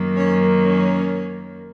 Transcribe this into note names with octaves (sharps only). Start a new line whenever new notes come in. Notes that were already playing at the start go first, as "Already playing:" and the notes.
Already playing: F#2 D#3 F#3 A#3
C#4 C#5
C#4 C#5